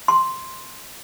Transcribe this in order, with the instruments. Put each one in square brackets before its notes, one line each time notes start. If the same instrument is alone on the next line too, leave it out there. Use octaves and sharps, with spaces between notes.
[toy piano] C6